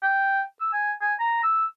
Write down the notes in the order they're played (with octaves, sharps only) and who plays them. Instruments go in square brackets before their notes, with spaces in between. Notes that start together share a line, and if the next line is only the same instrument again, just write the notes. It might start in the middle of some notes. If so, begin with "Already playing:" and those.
[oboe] G5
E6
G#5
G#5
A#5
E6